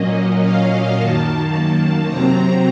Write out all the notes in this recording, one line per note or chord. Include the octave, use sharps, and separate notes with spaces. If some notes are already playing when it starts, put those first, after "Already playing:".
Already playing: A#2 F#3 A#3 C#4 D#5
F5
F#2 D#3 A#3 A5
C3 F#3 C4 A#5